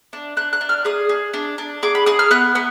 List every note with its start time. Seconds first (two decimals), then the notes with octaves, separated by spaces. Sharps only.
0.13 D4
0.37 D4 F#6
0.53 F#6
0.61 D4
0.69 F6
0.85 G#4 D#6
1.09 G#4
1.34 D4
1.58 D4
1.83 G#4 D6
1.95 B5
2.06 G#4 D#6
2.19 F6
2.31 B3 F#6
2.55 B3